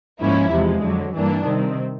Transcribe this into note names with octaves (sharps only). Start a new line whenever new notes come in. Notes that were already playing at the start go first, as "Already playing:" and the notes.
G#2 F3 A#3 C#4 E4
E2 C3 F3 G#3
F2 D3 F#3
G2 E3 G3 A#3 D4
C3 D#3 G3 C4